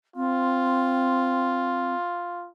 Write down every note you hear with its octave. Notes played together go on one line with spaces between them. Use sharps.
C4 F4